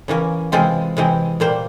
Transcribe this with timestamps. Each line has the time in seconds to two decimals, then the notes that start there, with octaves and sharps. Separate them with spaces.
0.08 C#3 E3 A#3 C#4
0.52 C3 E3 G#3 C4 F4
0.97 C3 E3 G#3 C4
1.40 A#2 G3 A#3 C5